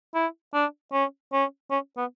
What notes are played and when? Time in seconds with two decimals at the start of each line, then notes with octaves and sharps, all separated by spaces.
0.15 E4
0.53 D4
0.93 C#4
1.33 C#4
1.70 C#4
1.97 B3